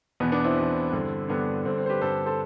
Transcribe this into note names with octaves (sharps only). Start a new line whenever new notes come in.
E2 B2 B3
B3 D4
C4 E4
E2 B2
G2 D3
G2 D3 B3 D4
G2 D3 C4
C4
C5
G4 B4
G2 D3 A4 C5
A4 C5